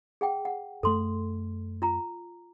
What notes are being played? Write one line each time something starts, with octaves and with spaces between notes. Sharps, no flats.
G#4 F#5 G5
F#5
F#2 A3 A4 C6
F4 A#5